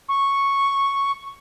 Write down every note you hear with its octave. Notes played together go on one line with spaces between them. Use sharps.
C#6